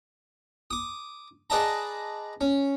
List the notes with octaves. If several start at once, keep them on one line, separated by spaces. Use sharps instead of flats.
D6 D#6
G#4 B4 D5 D#5 A5 A#5
C#4